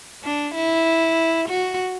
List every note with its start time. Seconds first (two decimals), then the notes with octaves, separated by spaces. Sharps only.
0.24 D4
0.55 E4
1.49 F#4